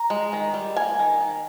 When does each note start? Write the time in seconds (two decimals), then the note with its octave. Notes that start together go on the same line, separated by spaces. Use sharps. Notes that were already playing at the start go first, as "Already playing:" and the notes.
Already playing: A#5
0.10 G#3
0.33 D#3
0.54 G3
0.76 A#3 G#5
0.99 D#3
1.21 D#3